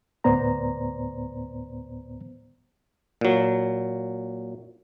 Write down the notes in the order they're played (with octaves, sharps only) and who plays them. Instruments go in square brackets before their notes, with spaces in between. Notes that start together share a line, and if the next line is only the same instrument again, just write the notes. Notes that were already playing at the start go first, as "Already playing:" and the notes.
[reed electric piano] D2 A2 B3 C5 D5 A#5
[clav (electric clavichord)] A#2 F#3